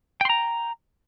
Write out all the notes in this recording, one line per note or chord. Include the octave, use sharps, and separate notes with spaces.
G5 A#5 C6